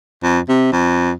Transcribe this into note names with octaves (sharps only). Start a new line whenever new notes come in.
F2
C3
F2